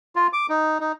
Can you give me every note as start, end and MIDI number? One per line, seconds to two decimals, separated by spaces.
0.16 0.27 65
0.33 0.46 86
0.49 0.78 63
0.80 0.92 63